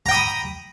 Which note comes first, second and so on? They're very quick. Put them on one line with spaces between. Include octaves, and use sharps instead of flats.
A#5 G5 D#6 B5